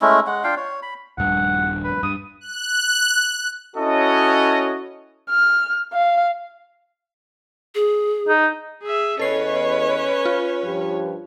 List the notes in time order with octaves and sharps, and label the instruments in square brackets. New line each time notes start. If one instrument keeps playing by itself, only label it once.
[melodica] G#3 A3 C#4 E4
G#3 F#5
D4 F4 F5 G5
C#5
B5
[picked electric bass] D#1 G2 [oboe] F#5
[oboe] B4
[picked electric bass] G2 [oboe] D#6
[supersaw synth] F#6
[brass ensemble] C#4 E4 F#4 A4 C#5 D#5
[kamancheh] F6
F5
[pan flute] G#4
[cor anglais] D#4
[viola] G#4 E5
[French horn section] E2 D#5 [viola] C#4 C#5 [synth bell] A4 C7 [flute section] B4
[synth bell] F4
[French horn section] G2 F3 G4